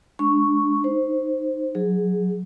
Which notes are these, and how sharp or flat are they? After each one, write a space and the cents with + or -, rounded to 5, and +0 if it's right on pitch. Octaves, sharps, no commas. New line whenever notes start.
G#3 +35 D4 +0 C#6 +0
D#4 -10 C5 +0
F#3 -20 G#4 +0